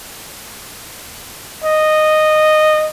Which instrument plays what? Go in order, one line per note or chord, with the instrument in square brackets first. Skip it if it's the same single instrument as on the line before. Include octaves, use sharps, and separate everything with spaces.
[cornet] D#5